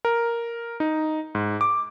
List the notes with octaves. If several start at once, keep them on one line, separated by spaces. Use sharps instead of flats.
A#4
D#4
G#2
D6